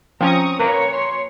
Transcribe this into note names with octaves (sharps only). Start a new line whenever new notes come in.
F3 C4 C#4 A#5 C#6 D#6
A#2 A#3 B4 C#5
C6